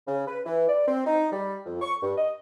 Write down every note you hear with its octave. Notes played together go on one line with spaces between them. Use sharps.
C#3
B4
E3
D5
C4
D#4
G3
F2
C#6
G2
D#5